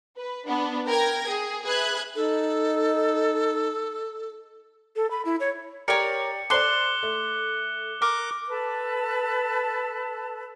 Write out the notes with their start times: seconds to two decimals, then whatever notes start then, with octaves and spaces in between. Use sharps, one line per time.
0.19 B4
0.48 B3 D4
0.89 A#4 G5 G#6 A#6
1.28 G#4
1.65 G#4 B4 E5 F#6 G#6
2.15 D#4 A4
4.96 A4
5.11 B5
5.25 E4
5.40 C#5
5.88 G4 A#4 C#5 D5 C#7
6.50 A4 C5 D5 C6 D6 F#6 G7
7.03 A3
8.02 A#4 D6
8.49 A4 B4 A5